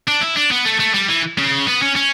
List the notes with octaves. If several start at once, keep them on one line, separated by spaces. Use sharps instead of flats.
D4
E4
D4
B3
A3
A3
G3
E3
C#3
B3
C#4
C#4